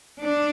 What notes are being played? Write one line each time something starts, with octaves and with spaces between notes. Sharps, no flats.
D4